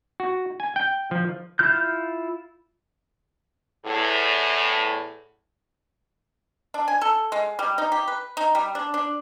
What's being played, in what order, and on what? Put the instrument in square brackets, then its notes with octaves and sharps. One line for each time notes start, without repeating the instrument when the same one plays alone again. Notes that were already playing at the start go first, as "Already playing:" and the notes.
[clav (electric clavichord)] F#4
G#5
G5
F3
[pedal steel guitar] E4 F4 F6 G6
[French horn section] E2 A2
[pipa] D4
G#5
A4
G#3
G3
D#4
G4
B4
D#4
G3
D4
D4